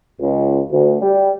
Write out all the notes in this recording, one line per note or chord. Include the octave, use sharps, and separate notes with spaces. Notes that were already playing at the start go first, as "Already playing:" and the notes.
C#2
D2
G3